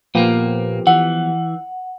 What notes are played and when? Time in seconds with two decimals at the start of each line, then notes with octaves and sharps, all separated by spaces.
0.15 A#2 F3 A#3 B3 G4
0.87 E3 F#5